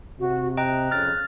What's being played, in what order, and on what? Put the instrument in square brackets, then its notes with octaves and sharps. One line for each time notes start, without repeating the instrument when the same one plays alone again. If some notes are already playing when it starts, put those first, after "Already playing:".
[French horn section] C3 [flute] F#4
[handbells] D#5 G5 A#5 [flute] F#6
[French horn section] F2 C#3 [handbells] F6 A6